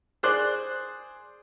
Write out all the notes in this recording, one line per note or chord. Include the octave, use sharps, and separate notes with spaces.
G#4 C5 D5 F#6